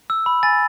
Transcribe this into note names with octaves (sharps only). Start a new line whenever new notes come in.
E6
B5
G#5 A6